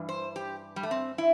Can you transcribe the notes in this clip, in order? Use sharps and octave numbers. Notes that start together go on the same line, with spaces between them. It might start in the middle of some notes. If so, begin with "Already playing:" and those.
Already playing: G2 E3
C5
G4
G3
A3
C4
E4